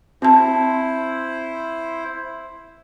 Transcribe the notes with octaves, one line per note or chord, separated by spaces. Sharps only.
C4 E4 C5 A5